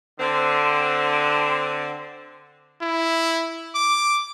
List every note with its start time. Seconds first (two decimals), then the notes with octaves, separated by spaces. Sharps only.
0.20 D3 C4
2.82 E4
3.75 D6